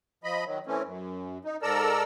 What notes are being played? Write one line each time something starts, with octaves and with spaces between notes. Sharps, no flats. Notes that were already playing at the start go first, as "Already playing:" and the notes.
F3 D#5 B5
D#3 F#3
E3 A3 C4 C#4
F#2
D#4
G#2 A4 A#4 D5 A#5 E6